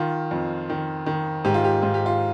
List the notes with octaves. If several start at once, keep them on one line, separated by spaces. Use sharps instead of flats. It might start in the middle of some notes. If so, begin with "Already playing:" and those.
Already playing: D#3 F4
F2
D#3
D#3
G#2 G4
F4
G4
G#2 F4
G4
F4